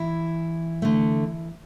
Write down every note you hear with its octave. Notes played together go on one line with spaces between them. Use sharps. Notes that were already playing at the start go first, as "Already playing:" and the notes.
Already playing: E3 E4
D3 A3